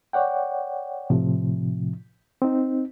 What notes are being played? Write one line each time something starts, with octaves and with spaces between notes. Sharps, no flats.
C#5 D5 F#5 G5
A2 C3 F3
C4 D#4